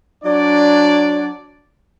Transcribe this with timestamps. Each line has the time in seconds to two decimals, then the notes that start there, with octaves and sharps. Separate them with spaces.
0.24 F#3 D4 D5